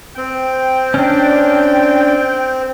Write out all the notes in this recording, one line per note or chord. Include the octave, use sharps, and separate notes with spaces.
C4 G5
C#4 D4